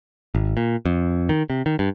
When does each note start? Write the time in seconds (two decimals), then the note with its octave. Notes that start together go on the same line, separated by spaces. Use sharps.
0.35 G#1
0.57 A#2
0.85 F2
1.29 D#3
1.50 C3
1.66 D#3
1.79 G2